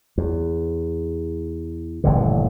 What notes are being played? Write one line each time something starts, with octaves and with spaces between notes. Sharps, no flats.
E2
D#1 A1 G2 D3